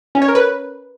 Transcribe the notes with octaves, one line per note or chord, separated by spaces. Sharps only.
C#4
C#5
A#4
B4